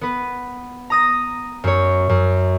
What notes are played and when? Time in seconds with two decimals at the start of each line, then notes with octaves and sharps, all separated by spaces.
0.01 B3 B4
0.90 A#5 D#6 A#6
1.64 F#2 C#5
2.09 F#2